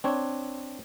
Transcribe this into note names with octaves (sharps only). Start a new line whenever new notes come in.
C4 D4 C#5